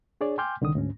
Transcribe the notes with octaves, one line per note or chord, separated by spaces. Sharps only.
D4 G#4 C#5 D5
G5 G#5 C6 D6 F6 G6
C2 D3 D#3 D#6
D2 G#2 C#4